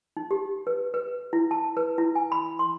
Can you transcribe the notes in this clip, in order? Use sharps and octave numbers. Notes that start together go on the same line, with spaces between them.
D#4
G4
B4
B4
E4
A5
B4
E4
G#5
B5
C6